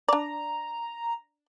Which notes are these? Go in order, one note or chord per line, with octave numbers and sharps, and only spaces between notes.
D4 D5 A#5